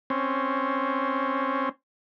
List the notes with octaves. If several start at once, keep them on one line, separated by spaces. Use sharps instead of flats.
C4 C#4